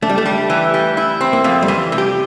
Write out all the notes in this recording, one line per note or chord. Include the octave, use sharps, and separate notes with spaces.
A3 D4
G3
A3
G3
E3
G3
E4
C4
A#3
F2 A3
G3
E3
C3
G4